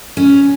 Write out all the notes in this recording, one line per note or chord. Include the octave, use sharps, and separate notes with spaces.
C#4